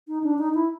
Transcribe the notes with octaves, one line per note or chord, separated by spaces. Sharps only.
D#4
D4
D#4
E4